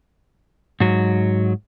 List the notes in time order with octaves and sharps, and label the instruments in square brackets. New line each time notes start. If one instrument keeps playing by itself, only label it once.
[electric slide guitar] G#2 F#3